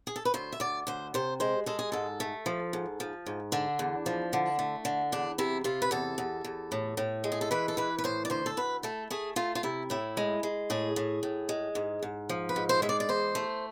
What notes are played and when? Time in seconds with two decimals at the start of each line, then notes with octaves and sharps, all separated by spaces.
0.07 G#4
0.16 A4
0.25 B4
0.34 D2 C5
0.52 E5
0.60 D2 D5
0.87 D2 C5
1.14 C3 C5
1.40 G#3 C5
1.66 G#3 A4
1.79 G#4
1.92 G#2 A4
2.20 A3
2.46 F3
2.73 G#2
3.00 F3
3.26 G#2
3.52 D3 D4
3.79 E2
4.06 F3
4.33 D3
4.59 A3
4.85 D3
5.12 E2 D4
5.38 C3 E4
5.64 C3 F4
5.82 B4
5.91 E2 A4
6.18 E2
6.44 E2
6.72 A2
6.97 A2
7.24 G#3
7.32 G#4
7.41 A4
7.51 E3 B4
7.68 A4
7.77 E3 B4
7.99 B4
8.04 A2 C5
8.25 D5
8.30 D2 C5
8.46 A4
8.57 D2 B4
8.83 A3 A4
9.10 A3 G#4
9.36 A3 F4
9.55 F4
9.63 C3 E4
9.90 A2 E4
10.17 G#3
10.43 G#3
10.70 A2 G#4
10.96 A2
11.23 A2
11.49 G#3
11.75 G#2
12.03 G#2
12.29 F3
12.49 B4
12.56 G#2
12.69 C5
12.82 G#3 E5
12.89 D5
13.00 D5
13.09 E2 C5
13.35 A3